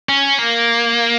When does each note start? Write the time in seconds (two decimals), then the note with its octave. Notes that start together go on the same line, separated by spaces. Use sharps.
0.09 C#4
0.38 A#3